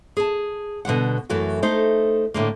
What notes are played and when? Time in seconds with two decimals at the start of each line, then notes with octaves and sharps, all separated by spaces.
0.17 G#4 A5
0.85 B2 D3 G3 F#5
1.30 F#2 E3 A3 F#4
1.62 A3 D#4 A4 C5
2.34 A2 D3 A#3